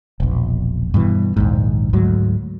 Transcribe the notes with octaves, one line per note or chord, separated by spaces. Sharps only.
E1 A#1
G2 B2 E3
A#1 D#2 G#2
D2 G#2 F#3